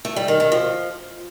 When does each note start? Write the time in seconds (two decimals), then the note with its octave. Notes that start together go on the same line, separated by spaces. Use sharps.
0.05 A3
0.16 G3
0.28 D#3
0.40 D#3
0.52 F3